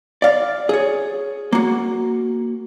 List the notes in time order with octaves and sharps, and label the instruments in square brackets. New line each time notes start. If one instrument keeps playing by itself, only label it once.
[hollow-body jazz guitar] D5 F5
G#4 C#5
A#3 F#4